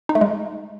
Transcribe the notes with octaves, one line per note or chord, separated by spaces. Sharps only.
D#4
A3
G#3